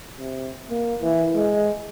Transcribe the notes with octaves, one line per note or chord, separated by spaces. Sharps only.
C3
A#3
E3
G#3